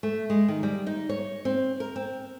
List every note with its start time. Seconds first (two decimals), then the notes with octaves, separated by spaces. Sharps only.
0.03 A3
0.30 G#3
0.48 D#3
0.63 G3
0.87 D#4
1.09 C#5
1.45 C4
1.80 A#4
1.96 C4